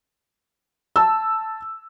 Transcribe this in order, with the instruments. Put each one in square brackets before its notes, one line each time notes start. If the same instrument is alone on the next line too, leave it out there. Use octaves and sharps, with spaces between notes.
[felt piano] A5 E6